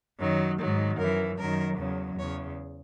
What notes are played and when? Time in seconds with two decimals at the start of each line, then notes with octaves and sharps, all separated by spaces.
0.19 F#2 D#3 F#3
0.59 G#2 D#3 F#3
0.98 F#2 E3 A#4
1.38 F#2 D#3 F#3 A#4
1.78 E2 C#3 F#3
2.18 E2 C#3 C#5